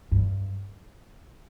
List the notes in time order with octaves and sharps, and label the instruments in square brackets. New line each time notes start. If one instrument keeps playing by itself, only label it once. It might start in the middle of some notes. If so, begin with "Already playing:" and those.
[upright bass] G2